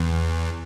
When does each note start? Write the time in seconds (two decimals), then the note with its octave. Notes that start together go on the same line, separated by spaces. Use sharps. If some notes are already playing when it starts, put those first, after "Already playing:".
Already playing: E2